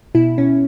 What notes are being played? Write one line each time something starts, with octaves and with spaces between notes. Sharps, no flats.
B2 E4
B2 C#4